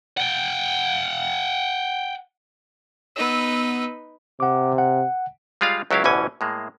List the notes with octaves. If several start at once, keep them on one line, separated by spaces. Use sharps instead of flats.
F#5 G5
B3 D#4 B4 E6
C3 F#5 D6
F#5
G3 G#3 F4 D5 F5
C#2 F#3 C#4 E4 G4 F5
A1 D2 B2 E3 C#4 G#5
A2 G#3 A#3